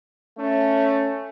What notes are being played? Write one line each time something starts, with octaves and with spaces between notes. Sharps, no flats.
A3 C#4